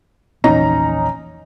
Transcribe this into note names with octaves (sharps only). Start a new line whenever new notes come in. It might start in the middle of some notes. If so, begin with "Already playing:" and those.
A#1 E2 C#4 D#4 A#5